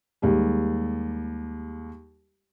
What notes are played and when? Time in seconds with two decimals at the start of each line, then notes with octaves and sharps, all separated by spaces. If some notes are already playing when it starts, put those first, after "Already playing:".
0.22 D#2 G3 G#3